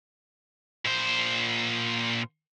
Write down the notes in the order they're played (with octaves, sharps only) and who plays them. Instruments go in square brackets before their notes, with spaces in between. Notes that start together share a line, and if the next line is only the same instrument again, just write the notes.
[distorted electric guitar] A#2 C5